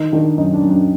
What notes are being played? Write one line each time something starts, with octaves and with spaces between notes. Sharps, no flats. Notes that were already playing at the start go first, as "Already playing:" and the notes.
Already playing: D#3 D#4
D#3 D4
F#2 D#4
D4
F#2
D4